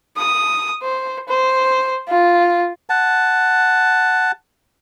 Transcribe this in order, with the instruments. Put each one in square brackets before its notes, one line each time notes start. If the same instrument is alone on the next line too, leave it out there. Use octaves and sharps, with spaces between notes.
[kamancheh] D#6
C5
C5
F4
[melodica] F#5 A5